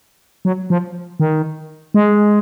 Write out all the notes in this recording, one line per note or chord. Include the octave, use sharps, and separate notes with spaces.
F#3
F3
D#3
G#3